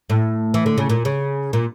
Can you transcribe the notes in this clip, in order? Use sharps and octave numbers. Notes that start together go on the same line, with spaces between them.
A2
E3
D3
C#3
A#2
C#3
A#2